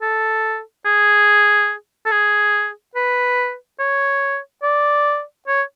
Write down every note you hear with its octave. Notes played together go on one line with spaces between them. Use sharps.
A4
G#4
A4
G#4
B4
C#5
D5
C#5